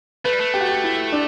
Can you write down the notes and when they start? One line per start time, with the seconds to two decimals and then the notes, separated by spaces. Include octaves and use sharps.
0.25 A3 B4
0.33 G3
0.40 A3
0.54 G4
0.61 F#4
0.68 G4
0.84 E4
1.12 D4